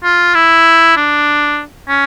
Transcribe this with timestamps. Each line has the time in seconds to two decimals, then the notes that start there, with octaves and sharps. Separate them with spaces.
0.04 F4
0.34 E4
0.96 D4
1.89 C#4